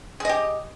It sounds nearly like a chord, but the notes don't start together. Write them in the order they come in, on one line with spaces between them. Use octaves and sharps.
G#4 D#5 G4